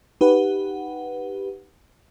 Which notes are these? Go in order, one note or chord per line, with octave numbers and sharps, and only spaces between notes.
D#4 G4 B4 F#5